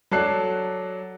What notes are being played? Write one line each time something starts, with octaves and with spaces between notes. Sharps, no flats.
F#3 A4 D5 A5 F#6 C7